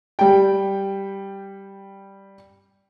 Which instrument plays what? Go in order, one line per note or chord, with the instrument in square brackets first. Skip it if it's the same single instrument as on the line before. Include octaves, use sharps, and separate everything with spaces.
[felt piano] G3 G5